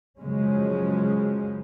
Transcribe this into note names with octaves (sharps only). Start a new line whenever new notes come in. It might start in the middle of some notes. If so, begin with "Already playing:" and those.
F#2 C#3 F3 G#3 C#4